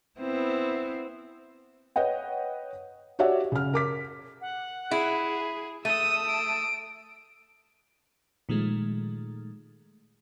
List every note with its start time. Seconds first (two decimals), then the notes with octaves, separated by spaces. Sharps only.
0.20 B3 C4 E4
1.96 B4 C#5 D#5 F#5 G5
3.19 F#4 G4 C#5 D5 E5 F#5
3.52 C#3 F6
3.73 A#4 D6 B6
4.41 F#5
4.91 E4 G#4
5.85 A3 D#6 E6 D#7
6.28 D7
8.49 A#2 D#3 F3 G#3 A3